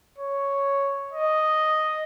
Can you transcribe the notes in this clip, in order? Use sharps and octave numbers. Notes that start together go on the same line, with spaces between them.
C#5
D#5